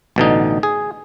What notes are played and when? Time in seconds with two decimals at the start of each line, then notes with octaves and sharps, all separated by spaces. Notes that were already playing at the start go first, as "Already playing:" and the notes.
0.16 A1 B2 D3 D#4
0.63 G#4